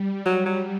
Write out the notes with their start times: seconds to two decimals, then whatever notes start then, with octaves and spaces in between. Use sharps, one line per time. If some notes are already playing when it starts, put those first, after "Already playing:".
Already playing: G3
0.26 F#3
0.46 F#3